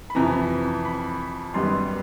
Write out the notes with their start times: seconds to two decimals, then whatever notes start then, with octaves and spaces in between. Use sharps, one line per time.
0.10 B5
0.15 F2 C3 E3 A#5
0.85 B5
1.54 F#2 D#3 G3 B3 C6